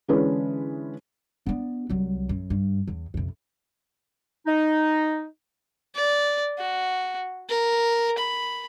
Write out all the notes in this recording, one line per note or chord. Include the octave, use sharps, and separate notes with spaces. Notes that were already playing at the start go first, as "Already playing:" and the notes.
D3 E3 G#3 C#4 D4 B4
B3 D4
C2 F#3
F#2
G2
E2
F2 C3
D#4
D5
F#4
A#4
B5